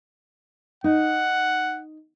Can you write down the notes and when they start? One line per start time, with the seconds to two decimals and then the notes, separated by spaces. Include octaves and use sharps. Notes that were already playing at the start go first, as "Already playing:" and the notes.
0.84 D#4 F#5